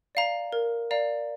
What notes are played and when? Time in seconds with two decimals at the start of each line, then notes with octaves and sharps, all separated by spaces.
0.15 D5 F5 A#5
0.52 A#4
0.91 D5 F5 A#5